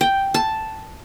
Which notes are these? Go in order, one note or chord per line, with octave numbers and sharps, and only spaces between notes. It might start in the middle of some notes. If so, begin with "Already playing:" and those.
G5
A5